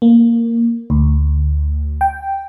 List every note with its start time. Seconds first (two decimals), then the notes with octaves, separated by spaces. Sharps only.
0.02 A#3
0.90 D2
2.01 G5